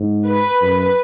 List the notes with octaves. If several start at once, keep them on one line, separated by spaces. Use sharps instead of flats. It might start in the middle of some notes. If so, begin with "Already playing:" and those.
Already playing: G#2
B4
F#2